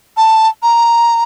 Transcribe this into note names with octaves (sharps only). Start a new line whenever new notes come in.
A5
A#5